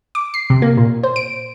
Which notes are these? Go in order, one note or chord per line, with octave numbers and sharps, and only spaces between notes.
D6
C7
C3
A#3
A#2
C5
D7